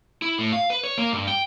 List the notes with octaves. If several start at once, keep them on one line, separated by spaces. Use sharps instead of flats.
E4
A2
F5
B4
C#5
A#3
G2
G5